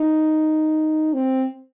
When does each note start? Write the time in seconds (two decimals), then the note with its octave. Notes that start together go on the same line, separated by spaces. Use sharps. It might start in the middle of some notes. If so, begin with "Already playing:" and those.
Already playing: D#4
1.13 C4